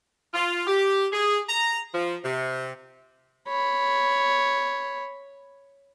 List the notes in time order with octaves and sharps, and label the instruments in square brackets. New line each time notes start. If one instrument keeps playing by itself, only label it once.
[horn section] F4
G4
G#4
A#5
F3
C3
[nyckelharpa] C#5 B5